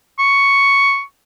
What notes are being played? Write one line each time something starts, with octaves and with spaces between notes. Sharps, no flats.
C#6